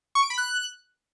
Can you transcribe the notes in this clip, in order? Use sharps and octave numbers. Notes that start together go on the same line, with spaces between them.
C#6
D7
B5
F#6